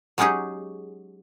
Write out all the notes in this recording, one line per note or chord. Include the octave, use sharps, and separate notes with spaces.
F#3 G#3 C#4 D#4 G4 G#4